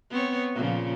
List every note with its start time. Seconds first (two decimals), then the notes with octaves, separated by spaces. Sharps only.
0.10 B3 C4 C#5
0.54 A#2 C#3 F3